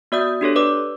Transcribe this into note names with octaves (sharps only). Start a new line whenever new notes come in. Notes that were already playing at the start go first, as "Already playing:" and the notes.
B3 F#4 D5 E5 D#6 G6
D4 G4 A4 C#5
B4 D5 D6